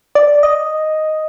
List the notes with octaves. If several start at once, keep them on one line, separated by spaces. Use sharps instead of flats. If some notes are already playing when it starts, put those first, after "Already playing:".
D5
D#5